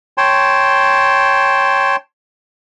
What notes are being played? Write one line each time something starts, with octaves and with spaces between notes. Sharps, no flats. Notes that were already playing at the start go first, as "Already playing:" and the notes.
C#5 G5 A5 C6